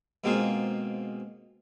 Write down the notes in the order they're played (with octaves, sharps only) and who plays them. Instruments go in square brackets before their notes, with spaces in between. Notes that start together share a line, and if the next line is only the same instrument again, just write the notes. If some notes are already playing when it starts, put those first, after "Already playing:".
[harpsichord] G#2 B2 A#3 C4 F4 G#4